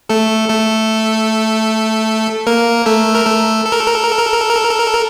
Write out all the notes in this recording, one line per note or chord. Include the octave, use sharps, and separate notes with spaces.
A3 A4
A3 A4
A#3 A#4
A3 A4
A#4
A3 A4
A4
A#4
A4
A#4
A4
A#4
A4
A#4
A4
A#4
A4
A#4
A4
A#4
A4
A#4
A4
A#4